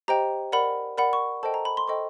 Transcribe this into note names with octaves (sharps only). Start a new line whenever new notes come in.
G4 C5 D#5 G5 A#5
A#4 D5 F#5 B5
A#4 D5 F#5 B5
C#6
A4 C5 D#5 G5 A5
A#5
B5
C6
A4 C5 D#5 G5 C#6